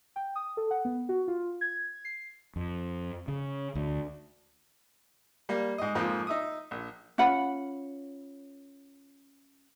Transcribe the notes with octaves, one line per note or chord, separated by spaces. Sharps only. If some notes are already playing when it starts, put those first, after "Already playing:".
G5
D#6
A4
F#5
B3
F#4
F4
G#6
C7
F2
C#3
D2
G3 A#3
G#2 D#5
F2 G#2 F3 A#3
D#4 E5 D#6
A#1
C#4 F4 F#5 B5